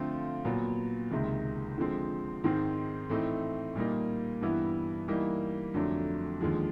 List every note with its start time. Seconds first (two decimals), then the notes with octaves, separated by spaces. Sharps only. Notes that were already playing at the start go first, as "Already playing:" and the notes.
Already playing: D3 F3 A3 C4 F4
0.45 A#2 F#3 B3
1.11 C#2 C3 D#3 G#3
1.78 D3 F3 G#3 C4
2.44 G#2 D#3 G#3 C4
3.10 A2 E3 A3 C4 D#4
3.75 A#2 G3 A#3 D#4
4.41 G2 E3 G3 B3 E4
5.08 E3 G3 A#3 D#4
5.74 F2 D3 F#3 A3 D4
6.41 D#2 D3 F3 G#3